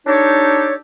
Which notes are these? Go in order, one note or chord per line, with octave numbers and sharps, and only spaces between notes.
D4 D#4 G4 A4 C#5